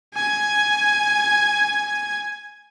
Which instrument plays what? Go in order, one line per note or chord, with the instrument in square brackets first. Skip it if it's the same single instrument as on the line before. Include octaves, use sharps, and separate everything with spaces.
[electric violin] G#5 G#6